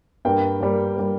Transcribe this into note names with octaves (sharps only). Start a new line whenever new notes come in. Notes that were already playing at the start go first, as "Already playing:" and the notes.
G2 G3 A#3 G5
G2 G3 A#3
G3 A#3